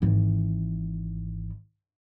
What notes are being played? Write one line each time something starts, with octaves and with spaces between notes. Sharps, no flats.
G#1 E3